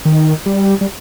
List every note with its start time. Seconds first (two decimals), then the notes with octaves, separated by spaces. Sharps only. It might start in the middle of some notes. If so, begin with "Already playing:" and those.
0.05 D#3
0.46 G3
0.81 G3